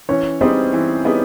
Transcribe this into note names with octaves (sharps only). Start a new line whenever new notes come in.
E3 C#4 C#5
G3 B3 C4 D#4 G#4 C5
E3
G3 B3 D#4 G#4